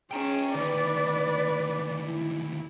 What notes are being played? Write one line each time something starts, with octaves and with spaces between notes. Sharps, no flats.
C#4 G#4 G5 A#5
D2 D#3 B4 D5
E4